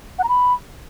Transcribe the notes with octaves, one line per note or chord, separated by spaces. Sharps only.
F#5
A#5
B5